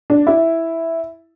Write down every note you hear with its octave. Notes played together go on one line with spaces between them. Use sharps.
D4
E4